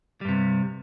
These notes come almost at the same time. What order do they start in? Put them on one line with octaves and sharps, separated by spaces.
G3 G2 C3